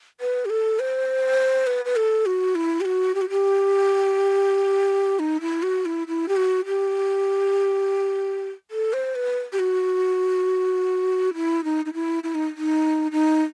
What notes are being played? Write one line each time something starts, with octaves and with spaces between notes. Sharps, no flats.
B4
G4
A4
C5
B4
B4
A4
F#4
E4
G4
F#4
G4
F#4
G4
D#4
E4
F#4
E4
E4
G4
F#4
G4
A4
C5
B4
G4
F#4
E4
D#4
D#4
E4
E4
D#4
D#4
D#4